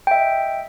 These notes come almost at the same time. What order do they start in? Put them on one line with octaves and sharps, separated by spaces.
G5 E5 D#5